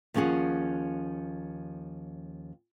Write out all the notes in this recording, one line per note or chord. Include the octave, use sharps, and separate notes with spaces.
D#2 F3 C#4 G#4 F#5